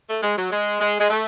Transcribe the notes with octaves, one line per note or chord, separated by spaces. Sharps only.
A3
G#3
F#3
G#3
G#3
G#3
A3